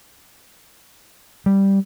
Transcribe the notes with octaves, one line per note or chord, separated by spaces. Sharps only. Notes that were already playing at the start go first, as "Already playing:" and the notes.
G3